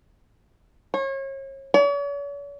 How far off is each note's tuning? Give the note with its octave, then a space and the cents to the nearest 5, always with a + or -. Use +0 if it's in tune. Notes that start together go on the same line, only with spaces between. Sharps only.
C#5 -35
C#5 +45